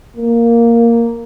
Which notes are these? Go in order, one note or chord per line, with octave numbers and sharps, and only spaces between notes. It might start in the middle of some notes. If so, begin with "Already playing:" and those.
A#3